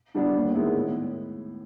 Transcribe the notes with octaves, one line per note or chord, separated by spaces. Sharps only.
D3 G3 B3 D4
D#2
D#3 G#3 B3 E4
A2